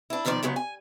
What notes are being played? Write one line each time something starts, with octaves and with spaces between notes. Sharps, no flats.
D4 E4
B2 D#3 F3 C#5 D5
C#3 F#3 G#3 B3
G#5